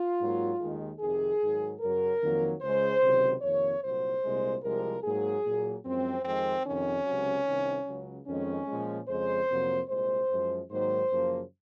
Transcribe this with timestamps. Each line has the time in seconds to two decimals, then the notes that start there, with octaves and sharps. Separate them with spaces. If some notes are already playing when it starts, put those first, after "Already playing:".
Already playing: F4
0.20 G#2 F#3 A#3
0.60 D#2 D#3 G#3
1.00 F2 C3 D#3 G#4
1.41 G#2 D#3 F#3
1.80 F#2 C#3 F#3 A#4
2.21 F2 D#3 F#3 A#3
2.62 C#2 C#3 G#3 C5
3.02 C#2 C3 D#3 F#3
3.42 F2 C3 D#3 A#3 C#5
3.83 C2 A#2 F#3 C5
4.24 C2 A#2 G#3
4.63 C2 C3 F3 G#3 A#4
5.04 G#2 F#3 A#3 G#4
5.45 A#2 F#3 A#3
5.85 F#2 F3 G#3 C4
6.25 F2 D#3 G#3 C4
6.66 F2 C3 D#3 C#4
7.06 C#2 C3 F#3
7.46 C2 C3 D#3
7.87 C#2 C#3 F#3
8.27 F2 D#3 G#3 C#4
8.67 A#2 F3 G#3
9.08 F2 C#3 G#3 C5
9.49 F2 C3 F#3 A#3
9.89 C2 A#2 G#3 C5
10.29 F#2 F3 G#3
10.69 G#2 D#3 F#3 A#3 C5
11.10 F#2 C#3 F3 A#3